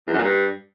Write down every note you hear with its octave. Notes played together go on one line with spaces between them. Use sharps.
E2
F#2
A#2
G2